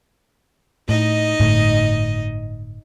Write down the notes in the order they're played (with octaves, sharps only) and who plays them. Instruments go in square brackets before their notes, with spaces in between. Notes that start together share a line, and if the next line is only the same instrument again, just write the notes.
[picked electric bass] A2 [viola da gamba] D#4 D#5
[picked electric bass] G1 A2 A3